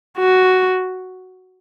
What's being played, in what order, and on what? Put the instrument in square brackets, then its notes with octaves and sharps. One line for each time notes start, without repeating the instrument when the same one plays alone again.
[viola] F#4